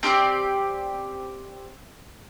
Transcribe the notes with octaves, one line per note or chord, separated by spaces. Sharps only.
C4 G4 A4 D5